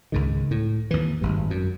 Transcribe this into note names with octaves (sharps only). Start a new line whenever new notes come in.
C#2 G#2 D#3
A2
D#2 E3
G#1 G2
F#2